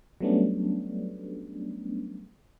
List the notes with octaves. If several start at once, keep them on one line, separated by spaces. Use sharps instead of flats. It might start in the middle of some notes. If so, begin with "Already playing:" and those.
F#3 G3 A3 B3 C#4 D4